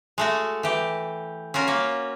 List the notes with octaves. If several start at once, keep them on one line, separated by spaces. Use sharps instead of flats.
G#3 A3 F#4
E3 G4
C#4 F4 F#4 A#4
A#3 C#5